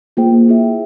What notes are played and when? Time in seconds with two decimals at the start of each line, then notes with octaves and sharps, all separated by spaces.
0.17 A#3 F4 G#4 C5 G5
0.48 E4 G#4 E5